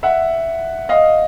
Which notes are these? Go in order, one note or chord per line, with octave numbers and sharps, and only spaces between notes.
E5 F#5
D#5 F5